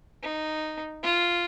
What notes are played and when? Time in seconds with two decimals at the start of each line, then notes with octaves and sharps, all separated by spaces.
0.23 D#4
1.04 F4